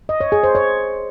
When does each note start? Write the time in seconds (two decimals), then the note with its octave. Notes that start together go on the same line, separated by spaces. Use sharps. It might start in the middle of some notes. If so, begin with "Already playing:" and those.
0.09 D#5
0.21 C#5
0.32 G#4
0.43 C5
0.55 C#5